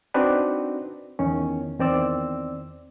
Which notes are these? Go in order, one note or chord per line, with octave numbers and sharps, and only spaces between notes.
C4 D4 D#4 F#4 B4 D5
E2 D#3 C#4
E2 D#3 C4 D5 E6